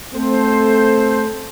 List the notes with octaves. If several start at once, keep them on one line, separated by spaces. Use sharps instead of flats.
A3 C4 A4 C5